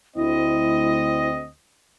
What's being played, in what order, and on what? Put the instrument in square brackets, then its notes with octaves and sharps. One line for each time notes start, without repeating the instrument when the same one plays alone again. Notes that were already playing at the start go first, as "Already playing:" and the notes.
[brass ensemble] D2 C4 D#5 [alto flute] E4